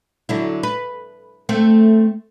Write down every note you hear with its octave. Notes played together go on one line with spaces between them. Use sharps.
D3 F#3 E4
B4
A3 C4